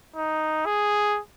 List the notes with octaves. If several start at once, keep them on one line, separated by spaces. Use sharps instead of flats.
D#4
G#4